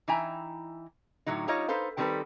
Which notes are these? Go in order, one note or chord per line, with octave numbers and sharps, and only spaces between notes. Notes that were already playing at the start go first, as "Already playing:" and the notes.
E3 D#4 E4 G5 G#5 A#5
A2 D3 F#3 D#4
G3 D4 D#4 F4 C#5 D#5
D#4 A4 B4 C5 F5
D#3 G3 C4 C#4 A4 B4